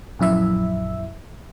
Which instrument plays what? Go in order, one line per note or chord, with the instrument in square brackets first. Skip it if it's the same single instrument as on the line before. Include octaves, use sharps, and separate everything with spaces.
[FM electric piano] A#1 F#2 E4 E5